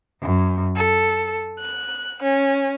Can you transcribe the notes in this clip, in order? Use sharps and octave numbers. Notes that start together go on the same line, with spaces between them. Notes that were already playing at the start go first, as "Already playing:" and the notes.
F#2
A4
F#6
C#4